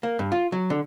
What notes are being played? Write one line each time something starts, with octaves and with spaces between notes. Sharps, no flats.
A#3
G2
F4
F#3
D3